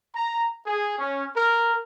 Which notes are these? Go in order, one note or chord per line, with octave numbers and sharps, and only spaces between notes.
A#5
G#4
C#4
A#4